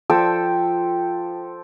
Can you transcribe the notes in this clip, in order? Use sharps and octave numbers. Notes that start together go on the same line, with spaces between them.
F3 A4 G5 E6